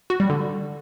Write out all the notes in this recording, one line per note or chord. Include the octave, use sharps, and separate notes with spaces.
F#4
G3
D3